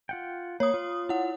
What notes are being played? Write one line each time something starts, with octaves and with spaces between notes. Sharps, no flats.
F4 F#5 G5
A#3 C#5 D#6
F4
E4 F#5